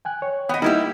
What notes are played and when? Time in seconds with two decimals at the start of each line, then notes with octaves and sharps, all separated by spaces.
0.05 G5 G#5 F#6
0.22 C#5
0.49 B3 D#5 G5 D#6
0.62 G3 A#3 D#4 E4 G4